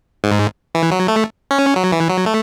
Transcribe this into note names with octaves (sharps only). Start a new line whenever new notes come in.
G#2
E3
F#3
A3
C#4
F#3
E3
F#3
A3